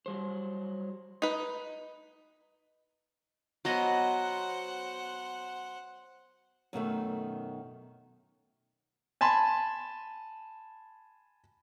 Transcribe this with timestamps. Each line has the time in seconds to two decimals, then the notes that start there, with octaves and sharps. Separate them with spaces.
0.06 F#3 G3 C5
1.22 D#4 B4
3.65 F#3 B3 C5 D#5 F#5
6.73 F#2 B2 D#3 A3
9.21 G#5 A5 B5 C6